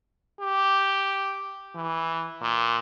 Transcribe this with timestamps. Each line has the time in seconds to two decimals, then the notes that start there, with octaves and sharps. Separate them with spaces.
0.41 G4
1.76 E3
2.42 A#2